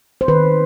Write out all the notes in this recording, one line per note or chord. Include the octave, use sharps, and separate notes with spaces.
C5
D#3 B4